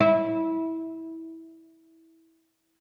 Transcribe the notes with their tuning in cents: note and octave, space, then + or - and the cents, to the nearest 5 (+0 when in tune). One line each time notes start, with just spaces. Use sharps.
E4 -20